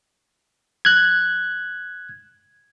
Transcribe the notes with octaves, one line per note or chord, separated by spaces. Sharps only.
F#6 G#6